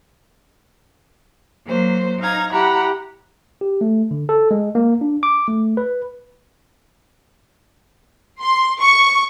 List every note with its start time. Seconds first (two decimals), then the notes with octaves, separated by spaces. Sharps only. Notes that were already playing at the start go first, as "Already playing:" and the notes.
1.65 F#3 A#3 C5
2.19 D#4 F5 A#5 G#6
2.52 E4 G4 F#5 A#5 B5
3.61 G4
3.81 A3
4.11 D3
4.29 A4
4.51 G#3
4.75 A#3
5.01 D4
5.23 D6
5.48 A3
5.77 B4
8.41 C6
8.81 C#6